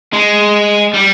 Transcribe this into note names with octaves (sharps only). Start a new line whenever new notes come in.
G#3
G3